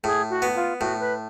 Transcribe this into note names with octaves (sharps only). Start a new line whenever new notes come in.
A2 G#4
F#4
B3
F4
A2 F#4
B4